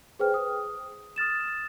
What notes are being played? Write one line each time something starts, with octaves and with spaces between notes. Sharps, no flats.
G#4 B4 C5 G5 F6
D#6
D#6 F6 A6 E7